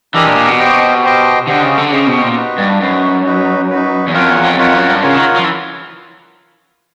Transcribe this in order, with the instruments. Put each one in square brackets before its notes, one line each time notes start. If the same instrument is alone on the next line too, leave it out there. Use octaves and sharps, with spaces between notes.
[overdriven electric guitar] E3 [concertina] D4 G4 A#4 D#5 G#5
[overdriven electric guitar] A#2
A#2
B2
[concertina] G4 C5 D#5 G5
G4 C5 D#5 G5
[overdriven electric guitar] D3 [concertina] G4 C5 D#5 G5
[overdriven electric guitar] C#3
D3
[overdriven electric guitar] C#3 [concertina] G4 C5 D#5 G5
[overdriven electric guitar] B2
A#2
[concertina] D#4 F#4 B4
[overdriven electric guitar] G2
[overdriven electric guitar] F#2 [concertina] D#4 F#4 B4
[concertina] D#4 F#4 B4
D#4 F#4 B4
[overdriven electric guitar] E2
[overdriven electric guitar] F2 [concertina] F4 A#4 C#5 F#5
[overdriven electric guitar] E2
F2
[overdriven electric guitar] F2 [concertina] F4 A#4 C#5 F#5
[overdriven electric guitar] F#2
G2
[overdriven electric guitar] C#3 [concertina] F4 A#4 C#5 F#5
[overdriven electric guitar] D#3
F3
E3